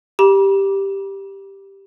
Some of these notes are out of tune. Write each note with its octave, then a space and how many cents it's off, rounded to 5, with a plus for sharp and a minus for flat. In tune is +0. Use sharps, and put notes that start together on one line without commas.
G4 +0 B5 -45